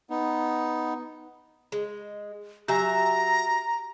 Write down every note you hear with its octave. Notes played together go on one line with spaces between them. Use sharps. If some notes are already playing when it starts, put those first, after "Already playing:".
B3 D#4
G#3
F#3 G4 E5 G#5 A#5